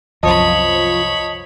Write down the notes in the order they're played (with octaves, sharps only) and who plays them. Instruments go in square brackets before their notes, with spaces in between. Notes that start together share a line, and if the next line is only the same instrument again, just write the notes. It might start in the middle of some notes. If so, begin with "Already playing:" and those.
[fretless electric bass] C2 F#2 [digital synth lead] F3 [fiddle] C#5 B5 [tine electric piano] D#5 A5 D#6